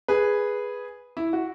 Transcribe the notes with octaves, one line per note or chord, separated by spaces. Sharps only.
G#4 B4
E4
F#4